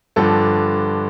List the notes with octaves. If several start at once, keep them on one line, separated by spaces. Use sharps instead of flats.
G2 D3 F3 A4